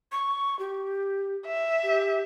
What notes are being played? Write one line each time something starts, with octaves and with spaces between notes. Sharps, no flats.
C#6
G4
E5
G4